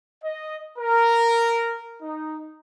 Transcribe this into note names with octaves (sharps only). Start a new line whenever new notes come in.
D#5
A#4
D#4